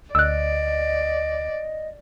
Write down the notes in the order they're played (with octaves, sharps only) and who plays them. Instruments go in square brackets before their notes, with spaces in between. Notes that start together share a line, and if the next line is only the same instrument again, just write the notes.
[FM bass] D2 [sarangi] D5 [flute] D#5 [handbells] E6 F#6